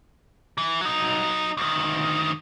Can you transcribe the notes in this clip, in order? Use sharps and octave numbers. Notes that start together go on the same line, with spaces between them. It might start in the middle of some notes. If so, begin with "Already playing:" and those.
E3
F#3 D#4
D2 D#3